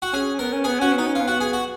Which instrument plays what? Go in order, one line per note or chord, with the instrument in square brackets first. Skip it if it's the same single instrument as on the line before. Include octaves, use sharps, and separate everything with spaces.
[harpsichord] F#4
[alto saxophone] C#4 [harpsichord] G#4
[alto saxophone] B3 [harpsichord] A#4
[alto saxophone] C#4
[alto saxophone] B3 [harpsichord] G#4
[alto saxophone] C#4 [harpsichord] F#4
[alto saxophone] B3
[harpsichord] D#4
[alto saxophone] C#4
[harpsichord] F4
[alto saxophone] B3
[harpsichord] F#4
G#4
F#4